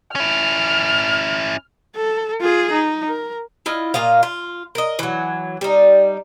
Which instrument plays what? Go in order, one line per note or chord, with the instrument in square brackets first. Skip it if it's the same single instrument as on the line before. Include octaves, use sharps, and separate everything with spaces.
[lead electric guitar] C#4 E4 [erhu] F6
[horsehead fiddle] A4
F4 G#4
D#4
A#4
[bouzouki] E4 F4 D#5
A#2 F4 D#5 F5
F4
A#4 D#5
E3 F#3
G3 D#4